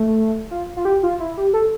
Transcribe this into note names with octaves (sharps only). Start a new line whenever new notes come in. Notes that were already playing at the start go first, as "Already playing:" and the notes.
Already playing: A3
F4
F4
G4
F4
E4
G4
A4